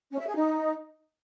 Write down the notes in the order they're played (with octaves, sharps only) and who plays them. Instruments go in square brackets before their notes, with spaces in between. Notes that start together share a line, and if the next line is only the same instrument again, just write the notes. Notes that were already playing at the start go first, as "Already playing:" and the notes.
[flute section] C#4
E5
G#4
D#4